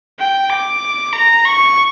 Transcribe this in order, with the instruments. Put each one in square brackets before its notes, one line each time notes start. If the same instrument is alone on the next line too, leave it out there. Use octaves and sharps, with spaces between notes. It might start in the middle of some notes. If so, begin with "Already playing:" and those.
[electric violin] G5
D6
A#5
C#6